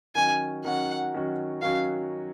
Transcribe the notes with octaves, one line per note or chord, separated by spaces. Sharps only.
D#3 F#3 C#4 F#4 G#5
D#3 F#3 C#4 F#4 F#5
D#3 F#3 C#4 F#4
D#3 F#3 C#4 F#4 F5